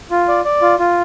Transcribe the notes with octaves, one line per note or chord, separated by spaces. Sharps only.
F4
D5
D5
F4
F4